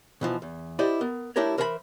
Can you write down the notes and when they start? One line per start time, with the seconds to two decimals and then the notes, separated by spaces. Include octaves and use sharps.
0.21 B2 E3 F3
0.42 E2
0.79 E4 G4 C5 D5 D#5
1.01 B3 A#4
1.36 A3 D4 E4 G4 A#4 C#5
1.57 E3 A#4 C5 E5 F#5 B5